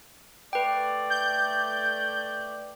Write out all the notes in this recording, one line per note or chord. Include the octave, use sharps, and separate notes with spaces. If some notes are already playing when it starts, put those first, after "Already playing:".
A3 B4 D5 G5
G6